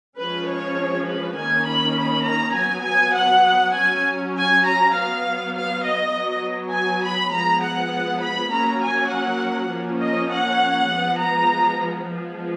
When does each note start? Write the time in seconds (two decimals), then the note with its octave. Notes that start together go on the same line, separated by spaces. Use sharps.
0.19 F3 G#3 C#4 B4
0.50 C#5
1.09 B4
1.38 D#3 A#3 C#4 G#5
1.69 B5
1.98 B5
2.27 A#5
2.57 F#3 B3 G#5
2.87 G#5
3.17 F#5
3.76 F#3 C#4 G#5
4.36 G#5
4.66 A#5
4.95 F#3 B3 F5
5.55 F5
5.85 D#5
6.14 F#3 B3
6.73 G#5
7.04 B5
7.32 F3 G#3 B3 A#5
7.63 F#5
8.21 B5
8.52 F#3 A#3 C#4 A#5
8.82 G#5
9.11 F#5
9.71 F3 A#3 C#4
10.01 D#5
10.30 F#5
10.89 F3 G#3 B3
11.19 A#5
12.08 F3 G#3 B3